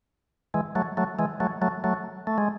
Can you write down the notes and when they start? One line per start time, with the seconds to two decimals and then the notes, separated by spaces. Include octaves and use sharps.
0.54 E3 G#3
0.75 F#3 A3
0.97 F#3 A3
1.19 E3 G#3
1.40 F#3 A3
1.62 F#3 A3
1.84 F#3 A3
2.27 A3
2.38 G#3